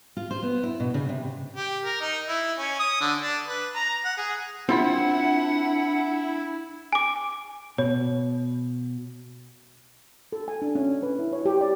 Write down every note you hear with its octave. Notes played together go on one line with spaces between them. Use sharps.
F4
C5
B3
E4
B2
C#3
C3
G4
A#4
D#4
E4
C#4
D#6
D3
D4
B4
A#5
F#5
G#4
C4 D4 E4 F4 F#5 B5
G#5 D6
B2 C#5
A4
G#5
D4
C#4
B4
E4
C#5
G4
D5